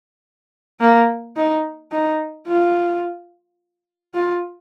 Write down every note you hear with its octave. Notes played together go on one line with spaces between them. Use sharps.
A#3
D#4
D#4
F4
F4